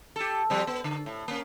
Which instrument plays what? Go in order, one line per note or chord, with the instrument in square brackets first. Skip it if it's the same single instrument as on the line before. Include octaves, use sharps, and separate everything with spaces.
[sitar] G4 A4
F3 G3 C4
B3
D3
A2
A#3 C#4